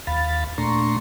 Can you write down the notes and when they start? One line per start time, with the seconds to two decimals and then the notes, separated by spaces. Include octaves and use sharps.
0.07 D#2 F5 B5 A6
0.58 A#2 A3 D4 A#5 C6 C#6